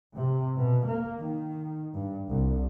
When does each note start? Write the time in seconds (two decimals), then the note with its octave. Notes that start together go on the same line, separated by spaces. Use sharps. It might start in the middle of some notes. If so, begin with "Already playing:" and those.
0.16 C3
0.58 B2
0.88 A#3
1.21 D#3
1.95 G2
2.29 C2